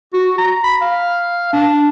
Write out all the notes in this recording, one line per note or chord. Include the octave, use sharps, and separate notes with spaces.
F#4
A#5
B5
F5
D4